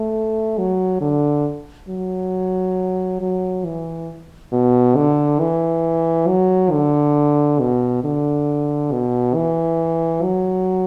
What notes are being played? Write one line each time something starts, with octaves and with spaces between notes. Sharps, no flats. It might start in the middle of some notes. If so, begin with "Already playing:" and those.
Already playing: A3
F#3
D3
F#3
F#3
E3
B2
D3
E3
F#3
D3
B2
D3
B2
E3
F#3